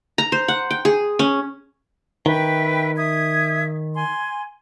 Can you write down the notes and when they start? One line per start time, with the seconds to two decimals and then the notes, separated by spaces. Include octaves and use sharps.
0.18 A#5
0.32 C5
0.48 F#5
0.71 G5
0.85 G#4
1.19 C#4
2.26 D#3 B4 E5 G5
2.97 E5 D#6 G#6
3.95 G#5 C6